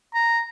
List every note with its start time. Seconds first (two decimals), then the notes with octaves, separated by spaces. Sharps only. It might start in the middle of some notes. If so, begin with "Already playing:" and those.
0.14 A#5